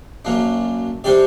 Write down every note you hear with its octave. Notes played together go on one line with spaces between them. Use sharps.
F#2 F#3 A#3 D4
C3 G3 D4 G4 D5